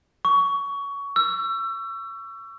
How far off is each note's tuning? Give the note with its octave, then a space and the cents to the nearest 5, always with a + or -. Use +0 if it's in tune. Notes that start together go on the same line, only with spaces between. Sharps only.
C#6 +20
E6 +30